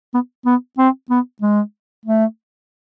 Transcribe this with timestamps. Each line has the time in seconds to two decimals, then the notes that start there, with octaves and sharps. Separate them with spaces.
0.14 B3
0.46 B3
0.78 C4
1.10 B3
1.42 G#3
2.06 A3